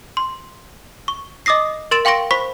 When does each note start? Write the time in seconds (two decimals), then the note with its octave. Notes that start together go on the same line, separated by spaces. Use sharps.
0.17 C6
1.08 C#6
1.46 D#5 D6 D#6 A#6 C7
1.91 A#4 C6 A6 D7 E7
2.05 F5 G5 C6 C#6 A#6 D7
2.31 C5 B5 C#6 B6